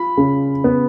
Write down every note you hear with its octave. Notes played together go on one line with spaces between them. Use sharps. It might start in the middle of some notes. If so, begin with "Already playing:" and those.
Already playing: F4 B5
C#3
B3